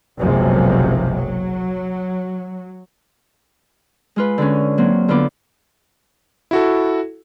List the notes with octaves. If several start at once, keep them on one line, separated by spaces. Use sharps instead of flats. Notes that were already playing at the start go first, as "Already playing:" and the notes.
F#1 B1 F#2 C3 F3 G#3
F#3
G#3 F4 B4
D3 G#3 C#4
F#3 A#3 C4
D3 B3 F4 B4 D6
E4 F#4 A4